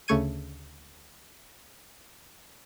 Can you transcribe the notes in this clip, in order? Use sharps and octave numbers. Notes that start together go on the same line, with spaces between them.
D2 C#3 A3 C#6 G#6 D#7